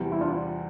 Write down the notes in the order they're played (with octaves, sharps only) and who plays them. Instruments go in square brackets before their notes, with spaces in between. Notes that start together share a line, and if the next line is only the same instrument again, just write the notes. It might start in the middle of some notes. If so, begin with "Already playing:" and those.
Already playing: [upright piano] E2 C3 E3 G3
[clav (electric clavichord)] E4
D4 F4